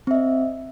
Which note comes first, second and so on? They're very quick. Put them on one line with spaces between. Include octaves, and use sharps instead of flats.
C4 E5 D#5